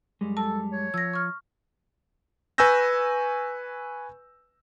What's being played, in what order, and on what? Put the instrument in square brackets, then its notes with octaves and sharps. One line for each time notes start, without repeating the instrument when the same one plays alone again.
[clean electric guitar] F#2 G3 G#3
[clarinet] A4 [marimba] A5
[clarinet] C#5
[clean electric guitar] F3 [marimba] E6 A#6
[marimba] C#6 F6
[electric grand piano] B4 G#5 C#6 E6 G6 A#6